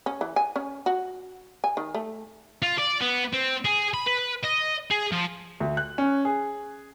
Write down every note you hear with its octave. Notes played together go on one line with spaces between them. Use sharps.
C#4
E3
G#5
C#4
F#4
G#5
D#3
A3
F4
D5
B3
C4
G#4
B5
B4
D#5
G#4
F3
D2
F#6
C#4
G#4